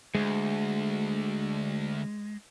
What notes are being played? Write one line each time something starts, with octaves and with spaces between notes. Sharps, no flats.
D2 G#3